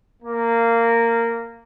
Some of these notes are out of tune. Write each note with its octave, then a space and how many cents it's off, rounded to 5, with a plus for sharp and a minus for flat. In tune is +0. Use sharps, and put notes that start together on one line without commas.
A#3 -15